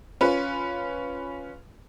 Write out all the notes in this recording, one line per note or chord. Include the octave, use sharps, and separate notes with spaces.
C#4 F4 B4